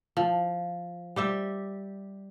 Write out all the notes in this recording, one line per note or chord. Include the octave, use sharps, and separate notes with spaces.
F3
G3 G4 E5